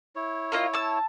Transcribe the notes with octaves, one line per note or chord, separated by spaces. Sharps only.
E4 C#5
A#3 F4 D#5
A5 E6